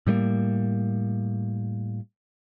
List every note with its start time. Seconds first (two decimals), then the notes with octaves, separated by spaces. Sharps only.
0.07 A2 G3 A3 A#3